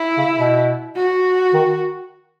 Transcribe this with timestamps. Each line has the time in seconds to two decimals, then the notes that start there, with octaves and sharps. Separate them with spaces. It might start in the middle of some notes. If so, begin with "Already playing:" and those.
Already playing: E4
0.17 C#3
0.36 B2
0.95 F#4
1.54 D#3